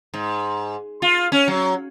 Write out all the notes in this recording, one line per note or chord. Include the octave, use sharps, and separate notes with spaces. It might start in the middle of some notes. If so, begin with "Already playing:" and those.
G#2
F4
C#4
F#3